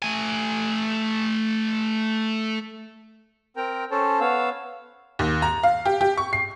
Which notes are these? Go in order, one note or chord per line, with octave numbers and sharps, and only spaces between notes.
A3 G#5
C4 A#4 G5 A#5
C#4 A4 C5 C#5 A5
B3 C#5 F5 E6
D#2
A#5
F5
G4
G4
C#6
C7